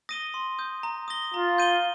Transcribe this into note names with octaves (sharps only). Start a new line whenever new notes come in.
D#6 A#6 D#7 G7
C6
D#6 G6
A#5
D#6 A#6 G7
F4 A#5
G6 D#7 G7